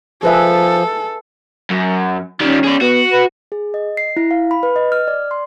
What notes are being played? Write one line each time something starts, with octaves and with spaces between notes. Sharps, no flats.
F3 G#4 A4 B4 E5
F#2
D#3 G3 C#4
G#4 D5
B3 F#4
B4
G#4
D#5
C7
E4
F5
B5
B4
D#5
F6
D5
C6